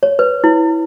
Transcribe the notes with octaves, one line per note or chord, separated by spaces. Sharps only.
C#5
B4
E4